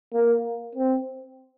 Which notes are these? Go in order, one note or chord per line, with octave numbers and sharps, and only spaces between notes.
A#3
C4